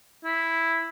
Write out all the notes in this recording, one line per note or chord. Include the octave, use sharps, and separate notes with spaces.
E4